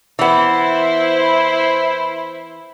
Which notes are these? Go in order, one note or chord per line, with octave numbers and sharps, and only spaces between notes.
E3 B3 E4 C5